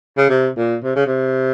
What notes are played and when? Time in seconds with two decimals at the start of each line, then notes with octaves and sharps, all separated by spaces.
0.17 C#3
0.29 C3
0.57 A#2
0.84 C3
0.96 C#3
1.06 C3